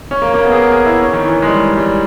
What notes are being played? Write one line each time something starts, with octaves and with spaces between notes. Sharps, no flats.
C#4
A#3
A#3
B3
G#4
A#4
G#4
E4
C#4
D#3
E3
G#3
G3
G3